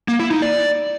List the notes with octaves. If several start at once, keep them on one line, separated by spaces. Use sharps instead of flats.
A#3
E4
D#4
D5